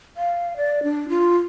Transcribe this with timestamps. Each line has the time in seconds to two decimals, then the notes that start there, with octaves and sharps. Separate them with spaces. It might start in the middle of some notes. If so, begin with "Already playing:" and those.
0.17 F5
0.57 D5
0.83 D4
1.09 F4